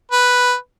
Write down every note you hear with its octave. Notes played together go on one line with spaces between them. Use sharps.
B4